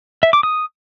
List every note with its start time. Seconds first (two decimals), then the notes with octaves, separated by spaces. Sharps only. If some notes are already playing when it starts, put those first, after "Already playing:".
0.23 E5
0.33 D6
0.43 D#6